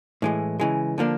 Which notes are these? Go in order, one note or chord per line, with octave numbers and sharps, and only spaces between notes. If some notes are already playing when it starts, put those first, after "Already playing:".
A2 E3 G#3
C#3 E3 G#3
D3 F3 A#3 D4